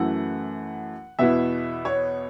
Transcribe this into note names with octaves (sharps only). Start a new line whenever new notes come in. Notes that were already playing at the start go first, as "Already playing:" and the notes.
Already playing: F#2 E3 A3 E4 F#5
E2 B2 B3 E4 E5
C#5